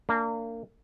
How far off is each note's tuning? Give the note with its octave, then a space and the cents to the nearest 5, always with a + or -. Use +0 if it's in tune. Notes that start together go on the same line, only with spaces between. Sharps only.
A#3 -30 D4 +0